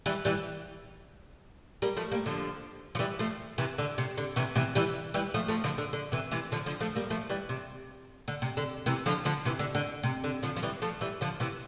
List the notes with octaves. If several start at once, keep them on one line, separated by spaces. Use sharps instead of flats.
E3 G3
E3 G3
G3 A#3
F3 A3
G3 A#3
D3 F3
F3
E3 G3
F3 A3
C3 E3
D3
C3
D3
C3 E3
C3 E3
E3 G3
E3 G3
F3 A3
F3 A3
D3 F3
D3
D3
C3 E3
C3 E3
D3 F3
D3 F3
F3 A3
G3 A#3
F3 A3
E3 G3
C3
D3
C3
D3
C3 E3
D3 F3
D3 F3
C3 E3
D3
D3
C3
D3
D3 F3
F3
E3 G3
F3 A3
E3 G3
D3 F3
C3 E3